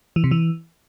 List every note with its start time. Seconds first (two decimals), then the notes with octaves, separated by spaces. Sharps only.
0.16 E3
0.24 C3
0.31 E3